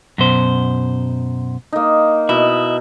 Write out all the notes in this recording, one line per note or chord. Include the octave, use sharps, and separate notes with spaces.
F#2 B2 C5
A#3 D#4
B2 E4